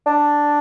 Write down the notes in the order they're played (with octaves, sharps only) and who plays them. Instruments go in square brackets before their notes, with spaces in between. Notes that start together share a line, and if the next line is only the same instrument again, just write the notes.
[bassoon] D4